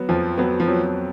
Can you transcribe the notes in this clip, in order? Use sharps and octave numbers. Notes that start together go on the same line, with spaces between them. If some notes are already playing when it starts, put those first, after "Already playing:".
Already playing: F#3 B3
F2 F3
F#3 B3
F3
F#3